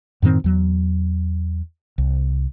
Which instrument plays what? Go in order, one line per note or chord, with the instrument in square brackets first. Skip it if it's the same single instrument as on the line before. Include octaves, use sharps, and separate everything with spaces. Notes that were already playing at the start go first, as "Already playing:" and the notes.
[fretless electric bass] F#2 A2 D#3 C4
E2 F#3
C2